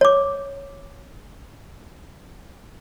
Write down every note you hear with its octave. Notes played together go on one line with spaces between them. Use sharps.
C#5 D6